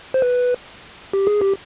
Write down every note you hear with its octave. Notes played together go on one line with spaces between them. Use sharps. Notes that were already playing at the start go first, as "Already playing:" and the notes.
C5
B4
G4
G#4
G4